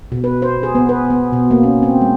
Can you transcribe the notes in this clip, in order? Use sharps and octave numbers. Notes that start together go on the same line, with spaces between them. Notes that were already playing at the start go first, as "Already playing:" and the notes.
B2
B4
C5
G#4
B3
B4
B3
B2
A#3
C#4
C4
G#3